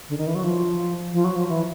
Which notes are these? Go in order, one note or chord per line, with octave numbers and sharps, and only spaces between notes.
D3
D#3
E3
F#3
F3
F3
F#3
F3
E3